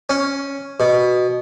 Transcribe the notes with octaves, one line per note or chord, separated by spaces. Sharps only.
C#4
B2